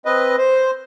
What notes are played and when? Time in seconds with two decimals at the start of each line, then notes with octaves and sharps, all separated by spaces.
0.05 C4 B4 D#5
0.38 C5